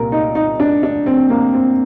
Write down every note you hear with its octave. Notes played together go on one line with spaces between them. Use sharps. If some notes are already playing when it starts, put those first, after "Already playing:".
Already playing: C2 A#2 A#4
D#4
D#4
D4
D4
C4
A#3
C4